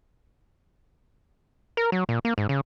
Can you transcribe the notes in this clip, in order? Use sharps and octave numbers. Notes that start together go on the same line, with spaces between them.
A#4
F#3
A#2
A#3
G#2
C#3